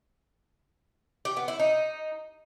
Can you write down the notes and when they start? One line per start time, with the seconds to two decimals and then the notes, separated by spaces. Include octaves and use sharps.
1.25 G4
1.37 B3
1.48 E4
1.59 D#4